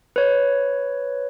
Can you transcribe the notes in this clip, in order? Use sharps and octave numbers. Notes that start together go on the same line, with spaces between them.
B4 C#5